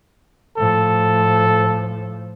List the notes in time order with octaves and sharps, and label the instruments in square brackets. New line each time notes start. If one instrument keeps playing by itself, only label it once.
[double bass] A2 F3 [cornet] A4